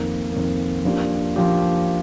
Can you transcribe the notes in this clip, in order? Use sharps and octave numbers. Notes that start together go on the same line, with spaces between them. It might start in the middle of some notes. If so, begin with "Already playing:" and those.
Already playing: F2 D#3 A#3
F2 D#3 A#3
F3 A#3 D4 G4
F3 A#3 D4 G4